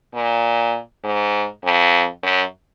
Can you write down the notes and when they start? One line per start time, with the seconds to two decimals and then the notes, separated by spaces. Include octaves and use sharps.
0.14 A#2
1.04 G#2
1.64 F2
2.23 F#2